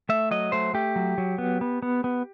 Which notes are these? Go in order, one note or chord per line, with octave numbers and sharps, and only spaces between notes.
A3 E5
F#3 D#5
A3 C5
A3 G4
F#3
F#3
B3
B3
B3
B3